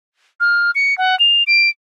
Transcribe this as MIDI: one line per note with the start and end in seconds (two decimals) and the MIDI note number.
0.40 0.71 89
0.75 0.97 97
0.98 1.18 78
1.19 1.43 101
1.47 1.69 98